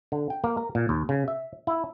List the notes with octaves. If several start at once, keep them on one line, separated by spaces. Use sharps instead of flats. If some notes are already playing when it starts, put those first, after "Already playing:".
D3
G5
A#3
A#4
A#2
D#2
C#3
E5
E4